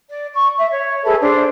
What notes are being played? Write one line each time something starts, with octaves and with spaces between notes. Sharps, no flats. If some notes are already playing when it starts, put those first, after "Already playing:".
D5
C#6
E5
C#5
G#4 A4 B4 E5
D4 C5 D5